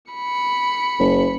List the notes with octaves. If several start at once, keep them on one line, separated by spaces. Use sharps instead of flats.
B5 C#7
F#1